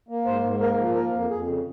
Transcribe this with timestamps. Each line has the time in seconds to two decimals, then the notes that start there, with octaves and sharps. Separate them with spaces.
0.09 A#3
0.26 G#2 C5
0.44 G#2
0.60 A#3 A#4
0.78 F3
0.95 A#3 A#4
1.13 F2
1.30 F2 G#4
1.47 C#3